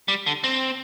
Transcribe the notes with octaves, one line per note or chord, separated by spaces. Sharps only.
G3
D3
C4